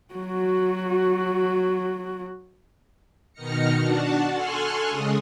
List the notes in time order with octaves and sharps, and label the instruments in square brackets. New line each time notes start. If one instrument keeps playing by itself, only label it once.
[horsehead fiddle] F#3 F#4
[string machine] B2 D#3 D#4 F6 A#6 C#7
D4 F#4 F#5 A5
A4 G#5 C6 C#6 F6 F#6
C#3 G#3 D#6